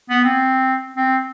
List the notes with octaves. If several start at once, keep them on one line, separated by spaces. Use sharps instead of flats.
B3
C4
C4